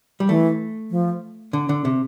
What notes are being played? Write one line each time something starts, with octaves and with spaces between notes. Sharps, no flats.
G3
E3 A3
F3
D3
D3
C3